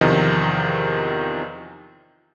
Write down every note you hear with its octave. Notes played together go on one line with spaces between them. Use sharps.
E2 C3 D#3 F3 D#5